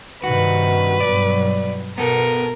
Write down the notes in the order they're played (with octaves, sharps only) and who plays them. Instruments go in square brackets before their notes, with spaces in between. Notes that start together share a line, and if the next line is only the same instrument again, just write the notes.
[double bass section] G2 C3 D#3 [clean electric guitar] F#4 [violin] B4
[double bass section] G2 B2 F#3 [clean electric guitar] D5
[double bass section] B2 [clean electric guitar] B3 A4 [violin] A#4